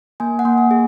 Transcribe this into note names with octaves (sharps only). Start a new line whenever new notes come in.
A#3 G#5
F#5
A#3
G#5
G#4